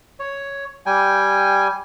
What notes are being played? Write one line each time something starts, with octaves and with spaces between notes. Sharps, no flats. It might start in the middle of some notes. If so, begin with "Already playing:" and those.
C#5
G3 G5 G#5